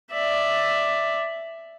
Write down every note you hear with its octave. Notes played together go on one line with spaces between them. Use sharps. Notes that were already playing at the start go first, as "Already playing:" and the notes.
D5 E5